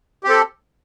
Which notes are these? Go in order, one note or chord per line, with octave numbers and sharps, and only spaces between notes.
C4 G4 A4